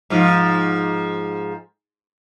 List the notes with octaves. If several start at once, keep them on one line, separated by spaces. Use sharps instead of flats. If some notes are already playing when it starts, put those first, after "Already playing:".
G#2 F3